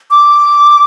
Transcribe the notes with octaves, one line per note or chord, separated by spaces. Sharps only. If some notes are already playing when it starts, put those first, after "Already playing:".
D6